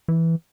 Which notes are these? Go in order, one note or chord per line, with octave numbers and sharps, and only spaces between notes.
E3